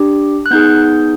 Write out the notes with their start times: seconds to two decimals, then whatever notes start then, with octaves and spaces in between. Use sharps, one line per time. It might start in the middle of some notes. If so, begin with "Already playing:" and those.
Already playing: D4 G4
0.46 F#6
0.51 B3 D#4 G#4 G6